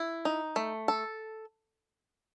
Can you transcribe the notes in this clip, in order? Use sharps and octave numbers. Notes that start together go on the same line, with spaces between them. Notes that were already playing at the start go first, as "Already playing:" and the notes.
Already playing: E4
D#4
A3
A4